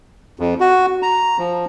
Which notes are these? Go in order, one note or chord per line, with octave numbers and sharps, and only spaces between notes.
F2
F#4
A#5
F3